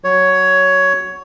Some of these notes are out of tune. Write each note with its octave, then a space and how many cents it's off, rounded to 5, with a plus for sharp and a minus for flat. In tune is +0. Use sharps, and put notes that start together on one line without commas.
F#3 +0 C#5 +10